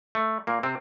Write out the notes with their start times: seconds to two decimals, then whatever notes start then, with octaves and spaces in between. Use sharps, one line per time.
0.15 A3
0.47 A#2 A#3
0.63 C3 C4